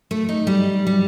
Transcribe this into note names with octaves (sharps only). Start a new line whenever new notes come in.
A3
D#4
G3
G3